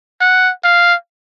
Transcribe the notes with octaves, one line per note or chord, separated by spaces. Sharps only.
F#5
F5